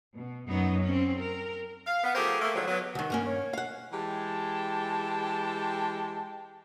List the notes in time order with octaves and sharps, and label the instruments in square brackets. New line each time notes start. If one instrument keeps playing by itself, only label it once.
[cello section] B2
F#2 F#3 B3 D#4
C4 C#4
A#4
[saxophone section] F5
B3
F3 A3 G4 G#4 A#4 C5
A3 A#3
G#2 D3 F3 F#3
F#3 B3
[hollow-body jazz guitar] C2 D#3 [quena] F#5
[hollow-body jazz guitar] G2 A#3 C#4
[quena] C#5
[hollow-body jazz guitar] F5 F#5
[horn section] E3 G#3 G4 G5 A5